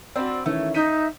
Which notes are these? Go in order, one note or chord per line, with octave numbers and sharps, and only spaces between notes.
C4 D4 F#4 B4 D5
D#3 E3 A3 C#4
D#4 E5 G6 D#7